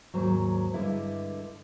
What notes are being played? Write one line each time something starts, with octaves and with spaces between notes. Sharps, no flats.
D#2 G#2 F#3
G2 D3 G#3 E4